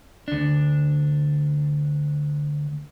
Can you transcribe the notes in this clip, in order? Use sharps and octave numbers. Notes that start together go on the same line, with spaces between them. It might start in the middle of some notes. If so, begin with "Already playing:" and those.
D2 D4